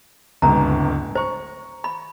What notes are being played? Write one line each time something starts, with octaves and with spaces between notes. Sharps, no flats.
D1 G1 C#2 A#5
C5 A#5 C#6
B5